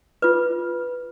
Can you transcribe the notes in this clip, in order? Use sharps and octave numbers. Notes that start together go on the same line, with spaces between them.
F4 B4